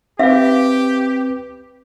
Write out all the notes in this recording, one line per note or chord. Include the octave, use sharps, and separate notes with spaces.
C4 G4 B4 E5 F5